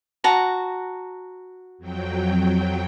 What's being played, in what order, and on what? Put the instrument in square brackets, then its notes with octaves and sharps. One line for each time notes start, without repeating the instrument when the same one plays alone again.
[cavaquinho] F#4 A5 A#5
[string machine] F2 F#3 G5